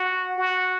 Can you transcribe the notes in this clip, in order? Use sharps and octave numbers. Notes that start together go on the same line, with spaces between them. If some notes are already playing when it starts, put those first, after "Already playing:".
Already playing: F#4
F#4